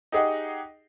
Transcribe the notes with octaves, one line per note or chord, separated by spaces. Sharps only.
D#4 G4 G#4 D#5 F#5